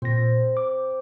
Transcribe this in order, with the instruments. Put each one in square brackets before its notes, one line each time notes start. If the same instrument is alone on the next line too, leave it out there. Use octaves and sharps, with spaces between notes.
[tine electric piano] A#2 A#6 [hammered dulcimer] C4
[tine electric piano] D6